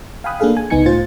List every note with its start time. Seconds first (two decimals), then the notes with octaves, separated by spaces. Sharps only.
0.24 F5 G5 G#5 B5 D#6 F#6
0.40 A#3 D4 G#4 A4 F5
0.57 G#5
0.70 C#2 B3 D#4 G#5 G#6 C#7
0.86 A2 F4 C5 A6